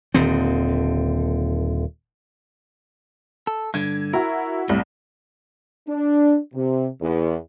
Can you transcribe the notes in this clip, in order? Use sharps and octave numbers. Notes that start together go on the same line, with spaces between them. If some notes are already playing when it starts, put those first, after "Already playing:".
D#1 D#2 D3 C4
A4
G2 D3 G#6
E4 F#4 A#4
C2 A2
D4
C3
E2